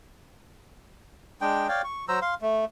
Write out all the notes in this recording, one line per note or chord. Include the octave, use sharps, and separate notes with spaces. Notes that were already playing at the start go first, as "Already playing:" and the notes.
G#3 D4 G5
C#5 D5 F5 G5
C#6
F#3 C5 A#5 E6
F5 C6
A3